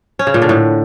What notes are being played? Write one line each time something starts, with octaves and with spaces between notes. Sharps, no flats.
C#4
C#3
A#2
D3
A2